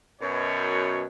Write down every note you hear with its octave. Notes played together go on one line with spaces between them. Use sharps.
F#2 B2 C#5